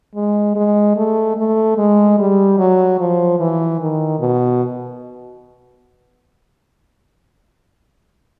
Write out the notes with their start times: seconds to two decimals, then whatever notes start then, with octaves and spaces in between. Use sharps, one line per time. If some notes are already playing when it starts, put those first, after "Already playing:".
0.15 G#3
0.56 G#3
0.96 A3
1.37 A3
1.77 G#3
2.19 G3
2.58 F#3
2.99 F3
3.40 E3
3.80 D#3
4.20 B2